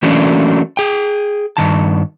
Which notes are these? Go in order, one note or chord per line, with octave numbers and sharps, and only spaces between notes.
E3 F#3 A3 A#3 C#4 D4
G#4 G5
G2 D#3 A5